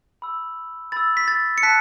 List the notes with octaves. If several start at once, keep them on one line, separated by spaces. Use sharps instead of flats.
B5 E6
B5 E6 A6
B6
A6
C#7
A5 F#6 B6